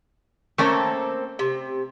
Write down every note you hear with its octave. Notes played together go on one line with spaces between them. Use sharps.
A3 A#3 C4 C#4 A4 A#4
C3